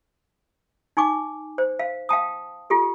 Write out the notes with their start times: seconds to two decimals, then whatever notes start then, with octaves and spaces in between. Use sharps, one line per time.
0.97 D#4 G#5 C#6 D6
1.58 C5
1.79 F5
2.09 F5 G5 A5 D#6
2.70 F4 G4 A4